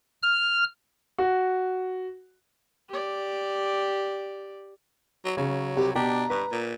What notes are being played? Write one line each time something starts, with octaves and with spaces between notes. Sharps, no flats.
F6
F#4
G4 D5
F#3
C#3 F#3
C2 G4
B2 D4 G4 A#5
G2 B4
A#2